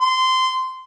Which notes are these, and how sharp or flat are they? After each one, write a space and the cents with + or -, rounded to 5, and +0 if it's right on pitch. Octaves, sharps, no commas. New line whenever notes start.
C6 -15